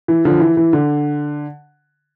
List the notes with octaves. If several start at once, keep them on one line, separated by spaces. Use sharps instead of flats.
E3
D3 F3
E3
E3
D3